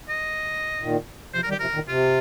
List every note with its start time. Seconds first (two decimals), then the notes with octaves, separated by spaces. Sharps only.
0.09 D#5
0.81 A#2 D#3
1.34 C3 F3 C5
1.43 A#4
1.48 D#3 G3
1.51 G4
1.60 C3 F3 A#4
1.74 A#2 D#3
1.88 C3 F4